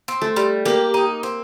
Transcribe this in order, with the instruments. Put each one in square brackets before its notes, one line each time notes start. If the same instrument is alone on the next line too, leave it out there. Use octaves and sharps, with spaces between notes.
[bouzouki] C4
[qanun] A3
[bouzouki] G3
[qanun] A#3 [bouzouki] G4
[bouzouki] D#4
C4